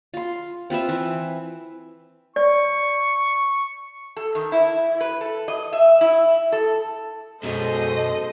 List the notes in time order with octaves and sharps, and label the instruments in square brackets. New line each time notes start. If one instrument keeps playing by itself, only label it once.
[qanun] F4 C6
C4 F4 B4 E5
E3
[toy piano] D5 [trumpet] C#6
[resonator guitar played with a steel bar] A4
D#3
E4
B4
A4
D#5
E5
E4
A4
[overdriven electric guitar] F#2 B2 [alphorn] G#3 [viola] A4 C5 [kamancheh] D#5